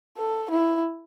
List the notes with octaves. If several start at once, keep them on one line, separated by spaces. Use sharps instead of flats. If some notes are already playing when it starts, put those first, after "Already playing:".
A4
E4